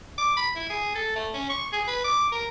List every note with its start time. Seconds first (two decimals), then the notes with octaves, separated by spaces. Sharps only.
0.18 D6
0.37 B5
0.56 E4
0.70 G#4
0.95 A4
1.16 A3
1.34 C#4
1.49 C#6
1.73 G#4
1.88 B4
2.04 D6
2.32 A#4